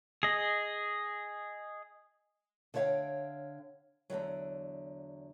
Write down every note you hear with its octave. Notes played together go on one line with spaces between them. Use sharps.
G#4 D#5
D3 C5 C#5 E5 F5 G5
E2 D3 D#3 F#3